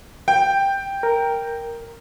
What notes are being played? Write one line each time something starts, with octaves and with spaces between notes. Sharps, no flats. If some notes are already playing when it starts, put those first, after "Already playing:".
G5
A#4